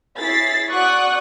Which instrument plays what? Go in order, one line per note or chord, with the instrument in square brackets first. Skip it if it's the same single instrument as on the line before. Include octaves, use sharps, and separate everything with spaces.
[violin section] E4 G#4 C#5 A6 B6 C7
F#4 D5 F#5 C#6 D#6 F#6